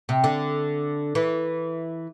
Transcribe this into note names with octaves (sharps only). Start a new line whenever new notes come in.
C3
D3
E3